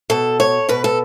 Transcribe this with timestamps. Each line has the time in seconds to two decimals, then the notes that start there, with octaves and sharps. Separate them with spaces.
0.10 B2 A4
0.40 C#5
0.69 B2 B4
0.84 A4